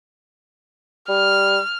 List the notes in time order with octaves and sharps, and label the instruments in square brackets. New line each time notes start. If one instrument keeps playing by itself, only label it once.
[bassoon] G3 [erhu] F6